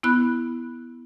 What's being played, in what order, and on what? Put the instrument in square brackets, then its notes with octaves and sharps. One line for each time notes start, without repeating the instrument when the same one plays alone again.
[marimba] B3 E4 B5 F#6